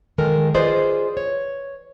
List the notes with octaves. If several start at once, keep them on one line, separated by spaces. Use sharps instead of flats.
D#3 F3 G#3 A4 A#4
F4 G#4 B4 C5 D5 D#5
C#5